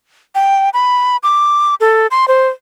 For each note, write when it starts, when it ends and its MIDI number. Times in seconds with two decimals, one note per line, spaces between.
0.35 0.70 79
0.74 1.17 83
1.23 1.75 86
1.81 2.07 69
2.11 2.28 84
2.28 2.47 72